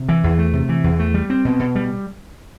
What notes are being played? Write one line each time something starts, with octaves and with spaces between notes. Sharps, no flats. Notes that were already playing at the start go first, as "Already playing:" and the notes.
Already playing: C3
E3
E2
A3
C3
E3
E2
A3
G3
C4
B2
B2
G3